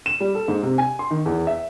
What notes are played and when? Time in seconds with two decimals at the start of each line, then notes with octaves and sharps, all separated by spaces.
0.06 E7
0.20 G3
0.35 A4
0.48 G#2
0.63 C3
0.78 G#5
0.99 C6
1.11 D#3
1.26 E2
1.47 E5